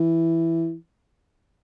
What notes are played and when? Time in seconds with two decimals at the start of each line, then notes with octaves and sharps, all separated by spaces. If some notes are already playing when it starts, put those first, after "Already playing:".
Already playing: E3